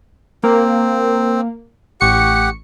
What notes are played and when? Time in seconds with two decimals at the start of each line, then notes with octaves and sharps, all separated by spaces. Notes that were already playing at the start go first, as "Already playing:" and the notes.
0.43 A#3 C4
2.01 A1 G4 F#5 C#6 C#7